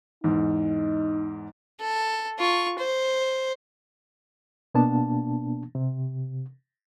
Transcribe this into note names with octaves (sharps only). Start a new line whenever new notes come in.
E2 G#2 D#4
A4
F4 C#6
C5
B2 A#3 B3 D4 A5
C3